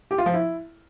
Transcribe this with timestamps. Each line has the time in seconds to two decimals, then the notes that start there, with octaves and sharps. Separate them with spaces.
0.11 G4
0.18 F4
0.26 F3
0.34 E4